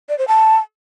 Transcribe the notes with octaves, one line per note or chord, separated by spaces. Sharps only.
D5
C5
A5